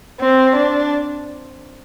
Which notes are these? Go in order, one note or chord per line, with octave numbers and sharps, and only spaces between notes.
C4
D4